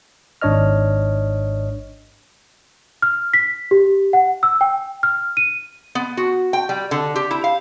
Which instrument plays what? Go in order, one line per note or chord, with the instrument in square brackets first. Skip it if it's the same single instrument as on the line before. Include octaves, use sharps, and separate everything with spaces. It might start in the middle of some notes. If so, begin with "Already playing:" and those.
[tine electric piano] G#1 G#2 D4 C#5 D#5 F6
[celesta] F6
B6
G4
F#5
E6
G5
F6
D#7
[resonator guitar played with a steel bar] B3
F#4
G5
G3
D3
G4
E4
F5